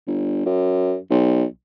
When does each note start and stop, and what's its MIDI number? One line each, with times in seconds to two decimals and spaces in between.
0.07 0.43 31
0.46 0.96 42
1.10 1.44 35